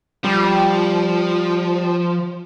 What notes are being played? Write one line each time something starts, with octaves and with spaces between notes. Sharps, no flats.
F3 G3